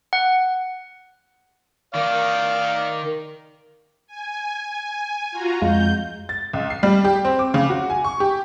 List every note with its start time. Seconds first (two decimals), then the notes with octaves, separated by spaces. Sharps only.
0.13 F#5
1.95 D#3 D5 F5
4.07 G#5
5.31 F4 F#4 A#5
5.62 F2 G#3 F5 G6
6.29 A6
6.53 C#2
6.70 C7
6.83 G3
7.04 G4
7.25 C4
7.39 D6
7.54 C#3
7.70 F#4
7.90 G#5
8.04 C#6
8.20 G4